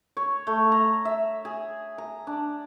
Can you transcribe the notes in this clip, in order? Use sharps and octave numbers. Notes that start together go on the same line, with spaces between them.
C#5
A3
A#5
E5
G#4
A#5
D4